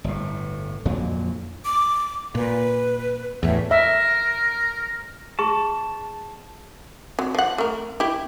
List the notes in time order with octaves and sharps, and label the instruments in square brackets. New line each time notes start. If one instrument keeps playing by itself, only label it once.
[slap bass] G1 A2
F2 A#2 D3 F#3
[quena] D6
[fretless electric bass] A#2 [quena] B4
[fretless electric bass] E2 A2 [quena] E5
[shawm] A#4 [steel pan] E5
[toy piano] G#4 C#6 [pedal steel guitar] A5
[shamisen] F#3 [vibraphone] C4
[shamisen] F3 F#5
A3 A#4
E4 G4